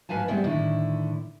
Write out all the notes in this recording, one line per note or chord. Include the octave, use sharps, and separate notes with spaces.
G#2 B4 F5 G#5 A5
G3 G#3 B3 C4 E4
A2 D3 D#3 E4